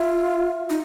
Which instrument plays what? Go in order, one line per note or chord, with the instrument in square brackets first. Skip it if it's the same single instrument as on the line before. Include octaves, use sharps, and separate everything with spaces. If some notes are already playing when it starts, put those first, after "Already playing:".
Already playing: [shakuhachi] F4 [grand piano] E5
[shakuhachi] D#4